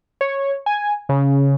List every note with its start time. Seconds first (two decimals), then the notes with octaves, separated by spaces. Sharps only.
0.21 C#5
0.66 G#5
1.09 C#3